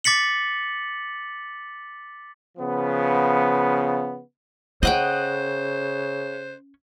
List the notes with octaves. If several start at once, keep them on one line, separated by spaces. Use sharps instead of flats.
D6 A6 B6 C#7 F#7
C#3 F3 B3
C#3 C#4 C5 D#5 F#5 G5